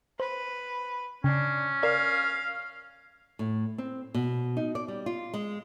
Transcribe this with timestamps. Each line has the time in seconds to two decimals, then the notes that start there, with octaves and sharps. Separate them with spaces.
0.20 B4 C5
1.24 C#3 C#4 D4
1.83 A#4 D5 F5
3.39 A2
3.78 C4
4.14 B2
4.57 D#4
4.75 D5
4.88 G3
5.06 F4
5.34 G#3